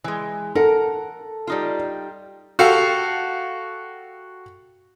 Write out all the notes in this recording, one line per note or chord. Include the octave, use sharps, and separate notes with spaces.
E3 G#3
A4 A#4 F#5
G3 D#4 F4
F#4 G4 A4 F5 F#5